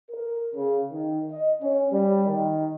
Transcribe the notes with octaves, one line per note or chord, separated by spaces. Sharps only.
A#4
C#3
D#3
D#5
C#4
G3
D#3